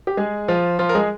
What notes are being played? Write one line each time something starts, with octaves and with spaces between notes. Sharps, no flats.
G4
G#3 G#4
F3 F4
F3 F4
A#4
G#3 G#4